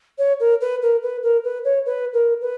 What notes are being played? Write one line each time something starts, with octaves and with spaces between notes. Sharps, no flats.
C#5
A#4
B4
A#4
B4
A#4
B4
C#5
B4
A#4
B4